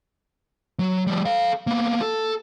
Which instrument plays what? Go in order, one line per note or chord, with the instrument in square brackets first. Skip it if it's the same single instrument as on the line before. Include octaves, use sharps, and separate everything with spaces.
[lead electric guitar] F#3
F3 G3
A4 F5
A#3 B3
A4